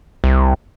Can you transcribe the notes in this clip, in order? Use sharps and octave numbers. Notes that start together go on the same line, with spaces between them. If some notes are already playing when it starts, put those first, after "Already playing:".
C2